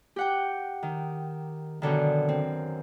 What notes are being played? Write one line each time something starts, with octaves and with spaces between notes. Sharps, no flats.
G4 F#5 G5
D#3
F#2 B2 D3 D#3
C4